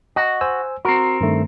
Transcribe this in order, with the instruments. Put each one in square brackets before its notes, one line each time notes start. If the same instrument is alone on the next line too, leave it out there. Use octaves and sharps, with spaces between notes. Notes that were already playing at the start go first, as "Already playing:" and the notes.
[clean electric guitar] F#4 [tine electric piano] D#5
[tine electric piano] C5 G#5 E6
[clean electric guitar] C4 A#4 [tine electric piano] F#4
[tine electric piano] G2 D#3 A3